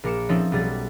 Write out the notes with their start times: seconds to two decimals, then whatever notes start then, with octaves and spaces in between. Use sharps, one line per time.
0.04 A#1 A#4 D6 C#7 E7
0.29 F3 C4 C#4 D#4 A4 E5
0.52 B1 G3 G#4 A6